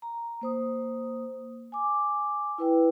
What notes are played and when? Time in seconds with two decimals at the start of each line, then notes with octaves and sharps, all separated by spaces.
0.02 A#5
0.41 A#3 C5 D#6
1.72 G#5 D6
2.58 E4 B4 G5